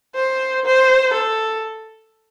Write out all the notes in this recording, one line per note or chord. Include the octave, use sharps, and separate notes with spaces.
C5
C5
A4